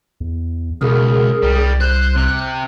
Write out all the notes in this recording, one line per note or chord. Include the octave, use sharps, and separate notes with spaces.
E2
C#2 B2 G#4 A#4
C2 G3
C5 F#6
C3